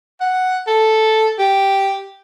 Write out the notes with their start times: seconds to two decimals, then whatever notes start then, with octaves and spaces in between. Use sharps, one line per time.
0.21 F#5
0.67 A4
1.39 G4